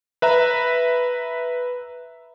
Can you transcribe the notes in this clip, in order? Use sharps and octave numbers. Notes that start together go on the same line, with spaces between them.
B4 E5 A#5